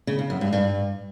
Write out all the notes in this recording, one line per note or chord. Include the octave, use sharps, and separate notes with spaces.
C#3
C#3
F#2
G2
G2